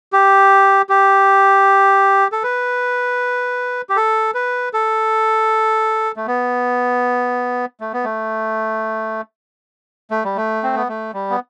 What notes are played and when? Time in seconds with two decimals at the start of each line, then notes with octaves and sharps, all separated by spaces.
0.13 G4
0.89 G4
2.32 A4
2.43 B4
3.89 G4
3.96 A4
4.34 B4
4.73 A4
6.16 A3
6.27 B3
7.80 A3
7.93 B3
8.04 A3
10.11 A3
10.24 G3
10.36 A3
10.63 C4
10.76 B3
10.88 A3
11.13 G3
11.30 B3